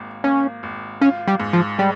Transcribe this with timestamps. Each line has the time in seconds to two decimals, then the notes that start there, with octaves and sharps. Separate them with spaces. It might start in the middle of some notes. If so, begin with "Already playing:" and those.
Already playing: G#1 A#3
0.24 A#3 C#4
0.63 G#1
1.01 C#4 F4
1.28 G3
1.40 G#2
1.53 F3
1.78 G3 G#3